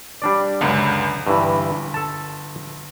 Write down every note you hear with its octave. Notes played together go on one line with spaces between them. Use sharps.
G3 D4 D5
C#2 F#2 D3
G1 G2 E3
A4 A5